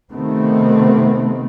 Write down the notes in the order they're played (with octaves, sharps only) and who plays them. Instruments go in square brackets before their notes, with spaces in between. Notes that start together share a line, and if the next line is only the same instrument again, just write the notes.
[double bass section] C3 D#3 A3 B3 C4